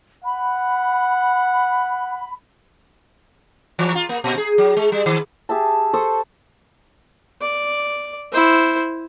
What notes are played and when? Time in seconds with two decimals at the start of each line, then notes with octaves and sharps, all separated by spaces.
0.25 F#5 B5
3.79 E3
3.95 F4
4.09 A#3
4.24 A#2
4.38 G#4
4.58 F#3
4.77 G#3
4.92 G3
5.06 D#3
5.49 G4 G#4 E5 A5
5.93 A4 C5 C#6 D#6
7.41 D5
8.32 E4 C5